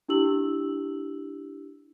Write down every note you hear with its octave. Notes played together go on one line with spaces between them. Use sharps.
D4 E4 G4 E6 F#7